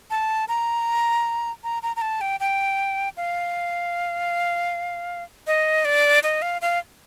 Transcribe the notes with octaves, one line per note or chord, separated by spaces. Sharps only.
A5
A#5
A#5
A#5
A#5
A5
G5
G5
F5
D#5
D5
D#5
F5
F5